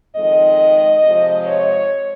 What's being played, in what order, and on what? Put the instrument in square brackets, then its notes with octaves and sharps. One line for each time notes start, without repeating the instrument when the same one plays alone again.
[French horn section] F2 D#3 G#3 D#5
C3 F3 G#3
C#5